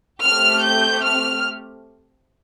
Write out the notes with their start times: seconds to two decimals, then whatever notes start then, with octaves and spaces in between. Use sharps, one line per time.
0.24 A3 C4 G4 F6
0.62 G6
1.02 F6